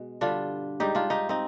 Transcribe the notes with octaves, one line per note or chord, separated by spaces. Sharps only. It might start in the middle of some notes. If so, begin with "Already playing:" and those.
Already playing: B2 G#3
G2 D3 G3 D4 F4
G#2 G3 D#4 G4
D4 F4
D#4 G4
C4 D#4